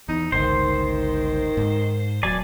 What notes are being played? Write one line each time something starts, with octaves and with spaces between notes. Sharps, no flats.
E2 D#4
G1 C#2 D#3 C5
G#2
D#1 F#3 D5 G#5 A5